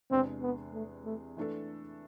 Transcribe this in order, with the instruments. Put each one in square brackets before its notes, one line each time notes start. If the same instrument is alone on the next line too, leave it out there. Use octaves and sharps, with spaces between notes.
[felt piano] E2 C3 G#3 D4 G#4 [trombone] C4
[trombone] B3
A3
A3
[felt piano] E3 A3 D4 A4